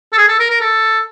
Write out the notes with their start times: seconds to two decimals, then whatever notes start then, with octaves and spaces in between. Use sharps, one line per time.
0.13 A4
0.18 G#4
0.29 A4
0.40 A#4
0.50 A#4
0.61 A4